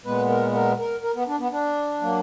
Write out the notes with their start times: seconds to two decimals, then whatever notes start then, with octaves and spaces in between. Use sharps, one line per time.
0.05 A#2 G#3 B3 B4
0.29 A#4
0.54 A#4
0.79 A#4
1.03 A#4
1.15 B3
1.28 D4
1.39 B3
1.52 D4
2.01 F#3 A#3